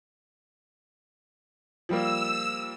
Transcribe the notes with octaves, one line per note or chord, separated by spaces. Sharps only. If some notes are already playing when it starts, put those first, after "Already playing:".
F3 G3 A#3 E6